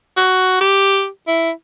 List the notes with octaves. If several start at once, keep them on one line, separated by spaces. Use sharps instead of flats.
F#4
G4
E4